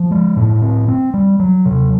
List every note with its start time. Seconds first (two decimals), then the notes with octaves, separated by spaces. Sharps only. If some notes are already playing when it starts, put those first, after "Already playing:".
Already playing: F3
0.11 G#3
0.37 A2
0.62 C4
0.88 C4
1.14 G3
1.39 F#3
1.65 C3